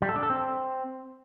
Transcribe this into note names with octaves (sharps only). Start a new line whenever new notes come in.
G3
A4
D4
A4
C4